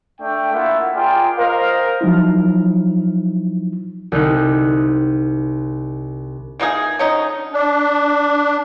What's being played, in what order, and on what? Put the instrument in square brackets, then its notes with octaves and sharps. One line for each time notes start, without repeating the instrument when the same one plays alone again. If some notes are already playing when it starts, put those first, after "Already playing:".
[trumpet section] A3 D4 G5
A#3 E4 F4 E5 F#5
F4 G#4 A#4 D5 G5
A#4 C5 D#5 F5
[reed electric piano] F3 F#3 D#4 E4
[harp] C2 D3 D#4 F#6
[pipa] E3 A#3 D#4 G#4
D3 C#4 D#4
[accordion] D4